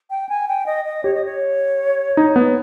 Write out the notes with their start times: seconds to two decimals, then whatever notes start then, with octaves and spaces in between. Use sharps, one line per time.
0.10 G5
0.29 G#5
0.48 G5
0.66 D#5
0.85 D#5
1.04 G4 C#5
1.14 D#5
1.25 C#5
2.17 D#4
2.36 B3